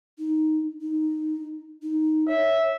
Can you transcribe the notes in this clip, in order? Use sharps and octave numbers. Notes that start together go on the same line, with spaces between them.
D#4
D#4
D#4
C#5 E5